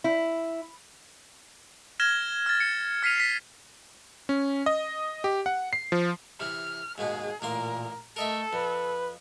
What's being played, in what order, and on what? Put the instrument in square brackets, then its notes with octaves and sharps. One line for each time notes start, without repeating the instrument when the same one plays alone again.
[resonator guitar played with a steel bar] E4
[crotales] F6 G#6 A#6 E7 G7
F6 A6
C#7
F6 B6 C7 D#7 F7
B6 C7
[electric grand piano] C#4
D#5
G4
F#5
C7
F3
[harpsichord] C3 E3 [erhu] F6
[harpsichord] D#2 G#2 B2 [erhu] G#4
[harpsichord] A1 A#3 C6 [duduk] A#2 [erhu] A#4
[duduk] A3 [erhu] A4 [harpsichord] A#4 D#5 E5
[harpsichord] F2 [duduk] B4